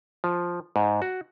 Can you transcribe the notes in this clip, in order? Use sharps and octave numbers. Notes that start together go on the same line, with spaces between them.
F3
G#2
F#4